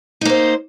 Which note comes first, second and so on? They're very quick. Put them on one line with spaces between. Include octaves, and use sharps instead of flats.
D#4 A#3 C5